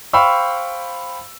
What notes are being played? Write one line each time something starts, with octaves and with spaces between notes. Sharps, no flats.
C5 F5 G5 B5 C#6 E6